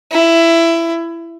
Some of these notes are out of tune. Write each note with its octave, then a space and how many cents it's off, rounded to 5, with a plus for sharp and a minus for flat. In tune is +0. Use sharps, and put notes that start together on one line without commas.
E4 +15